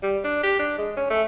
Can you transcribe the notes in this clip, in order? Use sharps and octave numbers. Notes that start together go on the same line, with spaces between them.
G3
D4
G4
D4
G#3
C#4
A3